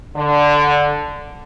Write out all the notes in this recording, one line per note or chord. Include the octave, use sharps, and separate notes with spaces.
D3